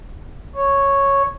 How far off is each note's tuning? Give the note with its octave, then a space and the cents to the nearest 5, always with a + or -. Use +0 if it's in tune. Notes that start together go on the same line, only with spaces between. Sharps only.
C#5 -5